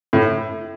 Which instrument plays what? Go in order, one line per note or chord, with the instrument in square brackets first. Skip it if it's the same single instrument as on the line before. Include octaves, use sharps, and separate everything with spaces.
[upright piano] A2